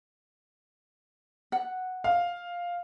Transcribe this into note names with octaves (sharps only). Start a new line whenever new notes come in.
F#5
F5